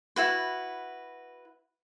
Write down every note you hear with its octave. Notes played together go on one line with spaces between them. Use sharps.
E4 F#4 B4